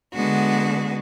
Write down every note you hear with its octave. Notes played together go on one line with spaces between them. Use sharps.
D3 G#3 B3 F#4